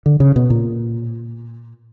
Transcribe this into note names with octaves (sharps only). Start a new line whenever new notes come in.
D3
C#3
B2
A#2